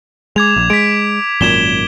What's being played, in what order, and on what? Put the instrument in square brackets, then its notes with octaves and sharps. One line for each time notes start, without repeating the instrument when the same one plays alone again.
[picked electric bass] G#3 [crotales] D6 G#6 F7
[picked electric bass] A#1
[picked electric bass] G#3 [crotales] B6 D7
[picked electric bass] G#1 F#2 A#2 [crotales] G#6 E7 G7